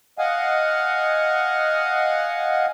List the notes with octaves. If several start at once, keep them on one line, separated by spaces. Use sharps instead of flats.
D#5 F5 F#5 G#5